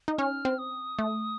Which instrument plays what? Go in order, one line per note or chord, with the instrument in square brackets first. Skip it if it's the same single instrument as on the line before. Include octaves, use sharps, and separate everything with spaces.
[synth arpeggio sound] D#4
[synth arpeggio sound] C#4 [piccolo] F6
[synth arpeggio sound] C4
[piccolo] D#6
[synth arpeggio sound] A3